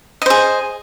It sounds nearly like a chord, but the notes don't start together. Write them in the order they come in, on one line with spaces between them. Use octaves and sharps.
D#5 C5 G#4